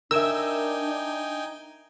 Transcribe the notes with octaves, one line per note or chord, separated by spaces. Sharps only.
D4 D#4 A#4 E5 G5 G#5 E6